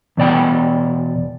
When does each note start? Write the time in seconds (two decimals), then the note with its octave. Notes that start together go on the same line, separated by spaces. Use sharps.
0.17 E2 B2 D5 G5